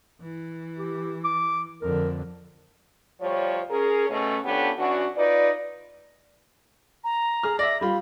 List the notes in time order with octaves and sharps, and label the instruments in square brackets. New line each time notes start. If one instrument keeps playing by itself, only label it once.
[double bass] E3
[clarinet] G4
D6
[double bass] F2 D3 [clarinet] A#4
[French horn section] D2 F3 G3 C#5
C#4 G#4 A#4
B2 A3 C#4
F3 B3 C#4 D4 G4 A4
E3 C#4 D4 F#4
D#4 F4 B4 D5
[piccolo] A#5
[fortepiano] G#4 F6
[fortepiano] D5 E5 [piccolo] A#6
[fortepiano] G3 F4 [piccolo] B5